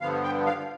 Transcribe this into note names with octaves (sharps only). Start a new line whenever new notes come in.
G2 D3 F3 B3 F5
G5
F5